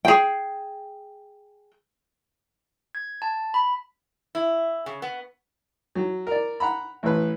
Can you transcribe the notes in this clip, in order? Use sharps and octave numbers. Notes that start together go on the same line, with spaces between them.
G#4 G5
G#6
A5
B5
E4
C#3
B3
F#3
A#4 D5
F#5 A#5 B5
A1 B4